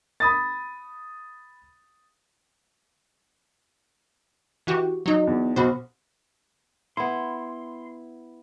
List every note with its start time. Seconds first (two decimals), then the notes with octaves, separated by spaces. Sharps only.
0.20 B5 D#6 A6
4.67 E3 F#4 G4
5.06 F#3 D#4
5.27 E2
5.56 B1 F#4 C5 B5
6.97 B3 E4 C6